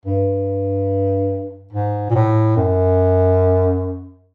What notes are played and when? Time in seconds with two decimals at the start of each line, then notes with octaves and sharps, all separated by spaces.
0.05 G2
1.73 G#2
2.10 A#2
2.15 A2
2.57 F#2